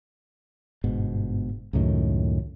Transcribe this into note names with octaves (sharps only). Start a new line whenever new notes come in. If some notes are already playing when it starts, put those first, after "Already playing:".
G1 G#2 B2
C#2 F#2 A2 D#3